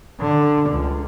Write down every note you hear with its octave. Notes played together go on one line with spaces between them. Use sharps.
D3
C#2